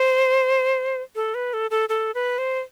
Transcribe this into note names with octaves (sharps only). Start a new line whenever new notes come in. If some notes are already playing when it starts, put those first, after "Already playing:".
Already playing: C5
A4
B4
A4
A4
A4
B4
C5